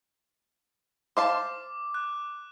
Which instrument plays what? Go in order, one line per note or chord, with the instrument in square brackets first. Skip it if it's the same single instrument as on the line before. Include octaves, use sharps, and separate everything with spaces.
[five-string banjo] C5 F5 A5 [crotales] D6
[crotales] F#6